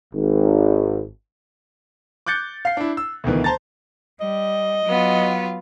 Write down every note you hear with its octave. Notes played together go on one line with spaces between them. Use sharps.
G#1
D6 F#6 G6 A6 C#7
F5 C7
D4 E4
E6
D2 B2 D#3 E3
C5 A5 A#5 A6
G3 D#5
F#3 B3 F4